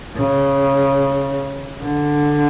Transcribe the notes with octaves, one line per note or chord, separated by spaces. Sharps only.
C#3
D3